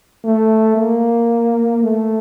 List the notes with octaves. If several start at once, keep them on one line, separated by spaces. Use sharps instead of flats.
A3
A#3
A3